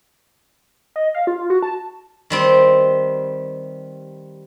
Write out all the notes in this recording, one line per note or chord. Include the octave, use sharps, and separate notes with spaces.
D#5
F5
F4
F#4
A5
D#3 G3 C4